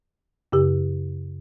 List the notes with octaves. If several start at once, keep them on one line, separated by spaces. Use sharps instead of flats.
F#2 C#3 G4